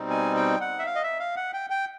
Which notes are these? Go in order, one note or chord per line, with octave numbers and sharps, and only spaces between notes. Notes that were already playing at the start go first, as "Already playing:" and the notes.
Already playing: B2 G3 C4 D#4
G#5
G5
F#5
E5
F5
D#5
E5
F5
F#5
G5
G5